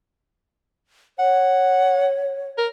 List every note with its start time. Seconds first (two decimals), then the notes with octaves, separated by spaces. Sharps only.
1.19 C#5 F#5
2.58 A#4